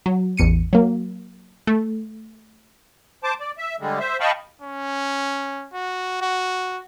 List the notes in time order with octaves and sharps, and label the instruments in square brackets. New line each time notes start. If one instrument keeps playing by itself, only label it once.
[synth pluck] F#3
A1 E2 C#7 D#7
F#3 A#3
A3
[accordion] C5 A5 D6
D5
E5
D3 G3 G#3
C5 E5
D#5 F5 G5 A5 B5 C#6
[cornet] C#4
F#4
F#4